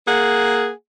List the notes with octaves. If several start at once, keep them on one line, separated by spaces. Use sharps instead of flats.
A#3 G#4 F#5